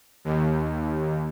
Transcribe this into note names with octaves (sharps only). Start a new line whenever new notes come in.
D#2